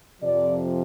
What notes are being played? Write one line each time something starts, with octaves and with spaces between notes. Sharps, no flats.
F2 C3 F3 D5